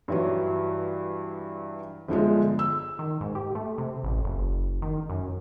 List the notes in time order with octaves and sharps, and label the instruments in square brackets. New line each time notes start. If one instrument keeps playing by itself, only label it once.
[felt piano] G2 E3 F#3
G1 D3 F3 G#3
E6
[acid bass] D#3
G#2
G4
A3
C3
A1
F#1
D#3
F#2